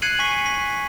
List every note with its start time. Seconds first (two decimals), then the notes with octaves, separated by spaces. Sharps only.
0.02 F#6 G#6 C7 C#7 D#7 F#7
0.19 G#5 C#6 B6
0.46 B6